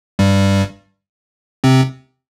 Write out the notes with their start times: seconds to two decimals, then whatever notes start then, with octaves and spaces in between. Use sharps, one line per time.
0.19 G2 G3
1.64 C3 C4